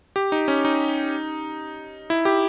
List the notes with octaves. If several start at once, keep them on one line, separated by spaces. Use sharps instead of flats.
G4
D#4
C#4
D#4
E4
G4